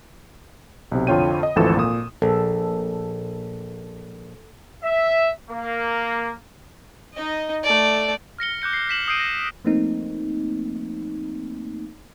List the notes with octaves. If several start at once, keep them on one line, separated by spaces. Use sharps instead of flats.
B1 C3
F2 D3 F4 C#5 G5 D#7
D#5
G#1 D2 E3 F3 A4 E7
A#2 D#6
A#1 A4
E5
A#3
D#4 D#5
A3 D5
F6 A#6 C#7 G7
D6 F#6 G6 C#7
C7 G7
B6 E7 F#7
D#6 E6 G6 C7 D7 D#7
A#6
F3 A3 A#3 C4 D#4